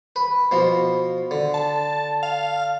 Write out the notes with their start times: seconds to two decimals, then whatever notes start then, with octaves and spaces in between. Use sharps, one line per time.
0.16 B4
0.51 B2 F3
1.31 D3
1.54 A5
2.23 F5